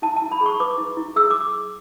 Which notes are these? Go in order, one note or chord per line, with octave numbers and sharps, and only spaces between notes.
E4 A5
A5
E4
B5
G#4
C#6
B4 D6
E4
E4
G#4 E6
D6